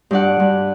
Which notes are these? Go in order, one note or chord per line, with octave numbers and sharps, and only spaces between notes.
G2 D5 F#5
G2